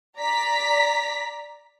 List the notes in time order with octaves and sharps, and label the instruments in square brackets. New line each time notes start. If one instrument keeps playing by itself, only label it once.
[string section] D5 A#5 B6